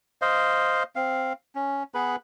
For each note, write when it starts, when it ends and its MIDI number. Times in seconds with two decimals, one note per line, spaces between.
0.22 0.83 72
0.22 0.83 75
0.22 0.83 77
0.96 1.33 60
0.96 1.33 77
1.55 1.83 61
1.94 2.16 59
1.94 2.16 68
1.94 2.16 71
1.94 2.16 83